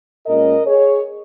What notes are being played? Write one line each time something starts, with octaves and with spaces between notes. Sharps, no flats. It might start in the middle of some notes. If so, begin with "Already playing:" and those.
A#2 G#3 C#4 A#4 D#5
G#4 C#5